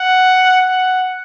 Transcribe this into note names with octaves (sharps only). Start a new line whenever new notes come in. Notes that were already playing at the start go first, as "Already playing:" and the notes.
Already playing: F#5
F#5